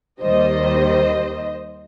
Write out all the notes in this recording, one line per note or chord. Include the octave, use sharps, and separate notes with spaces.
D#2 D#3 G3 C5 D#5